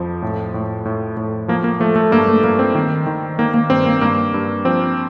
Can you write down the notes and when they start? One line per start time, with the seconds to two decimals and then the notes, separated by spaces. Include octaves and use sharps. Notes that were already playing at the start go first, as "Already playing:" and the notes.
Already playing: F2 F3
0.22 A2
0.54 A2
0.85 A2
1.17 A2
1.48 F3 A#3
1.64 A#3
1.80 F3 A3
1.96 A3
2.11 G2 A#3
2.28 A3
2.44 G2 A#3
2.59 C4
2.75 D#3
3.07 D#3
3.39 D#3 A#3
3.54 A#3
3.70 G2 C4
3.86 A#3
4.01 G2 A#3
4.34 G2
4.65 F3 C4